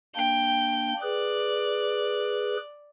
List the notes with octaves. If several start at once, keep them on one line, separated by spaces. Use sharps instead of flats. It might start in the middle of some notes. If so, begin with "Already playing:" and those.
A#3 D4 G5
G#4 B4 D5